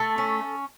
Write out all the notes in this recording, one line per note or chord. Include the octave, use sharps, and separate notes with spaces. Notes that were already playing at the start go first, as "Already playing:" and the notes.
Already playing: A3 A4
C#4